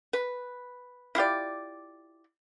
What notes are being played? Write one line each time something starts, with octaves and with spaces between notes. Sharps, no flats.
B4
E4 F4 G4 D5